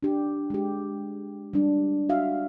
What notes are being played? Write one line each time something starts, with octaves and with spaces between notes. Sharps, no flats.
D4 G4
G#3 G4
G3 D4
F#4 E5 F5